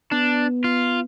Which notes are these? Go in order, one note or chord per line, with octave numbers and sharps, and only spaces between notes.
B3 D4
F4